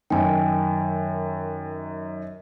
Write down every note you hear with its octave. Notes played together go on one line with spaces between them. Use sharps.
F#2 D#3 G5 G#5